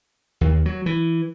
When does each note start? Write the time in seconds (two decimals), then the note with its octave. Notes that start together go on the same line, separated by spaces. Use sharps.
0.41 D#2
0.66 F#3
0.86 E3